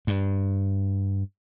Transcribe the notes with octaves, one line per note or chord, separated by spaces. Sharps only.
G2